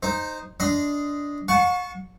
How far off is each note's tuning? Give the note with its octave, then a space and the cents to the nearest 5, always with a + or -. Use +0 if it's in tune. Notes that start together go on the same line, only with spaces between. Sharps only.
D#4 -10 C5 +0
D4 -15 D#5 +0 C6 -20
F#5 -45 A5 -25 C#6 +0